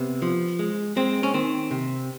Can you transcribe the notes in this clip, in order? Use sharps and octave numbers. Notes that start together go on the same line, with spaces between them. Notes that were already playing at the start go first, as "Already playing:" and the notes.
Already playing: C3 B3
F3
G#3
G#3 C4
C#4
D#3 C4
C3